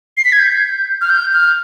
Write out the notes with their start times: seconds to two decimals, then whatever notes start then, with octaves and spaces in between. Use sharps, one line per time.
0.17 C7
0.25 B6
0.32 G#6
0.39 G6
1.01 F6
1.10 G6
1.33 F6